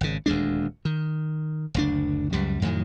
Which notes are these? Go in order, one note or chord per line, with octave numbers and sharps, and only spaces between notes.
G#1 C#3
D#1 D2 G#3 D4
D#3
F#1 D2 D4
C#2 F#2 G3
F2 A2 D#3 F#3